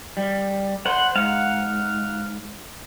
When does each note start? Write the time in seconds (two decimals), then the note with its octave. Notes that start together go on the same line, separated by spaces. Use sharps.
0.17 G3
0.86 C5 F#5 B5 C6
1.16 G#2 F5 F#5